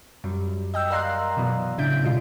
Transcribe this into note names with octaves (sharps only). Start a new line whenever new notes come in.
F#2 F#3 G3
D#5 G5 E6
A#4 D5 F5 A#5 C6 F#6
B2 E3 F#3 B3
A2 C#3 D4 E4 G6 D7
B2 G#3 F4